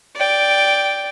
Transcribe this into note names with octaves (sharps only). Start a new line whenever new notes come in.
D5 G5